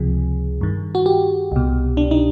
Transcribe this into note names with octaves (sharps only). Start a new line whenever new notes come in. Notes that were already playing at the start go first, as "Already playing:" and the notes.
Already playing: C#2 C3 F3 G#4
G2 D#3
F#4
G4
C2 B2
D4
D#4